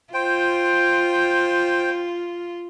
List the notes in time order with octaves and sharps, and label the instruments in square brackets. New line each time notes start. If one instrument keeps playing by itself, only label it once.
[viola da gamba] F4 [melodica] C5 G5